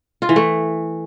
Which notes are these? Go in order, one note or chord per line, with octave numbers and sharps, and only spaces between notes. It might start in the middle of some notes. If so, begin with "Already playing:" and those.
F4
E3
A3